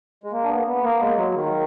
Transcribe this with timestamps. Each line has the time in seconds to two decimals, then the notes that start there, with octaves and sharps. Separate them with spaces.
0.24 G#3
0.32 A#3
0.44 D4
0.49 B3
0.67 B3
0.83 A#3
1.00 G#3
1.17 F#3
1.34 D#3